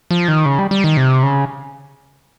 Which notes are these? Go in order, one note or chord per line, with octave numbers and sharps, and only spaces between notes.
F3
D#3
C#3
G3
G3
D#3
C3
C#3